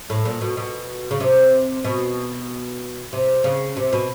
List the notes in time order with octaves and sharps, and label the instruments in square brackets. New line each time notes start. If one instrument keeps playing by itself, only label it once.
[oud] A2
A#2
B2
B2
C#3
C3
B2
C3
C#3
C3
B2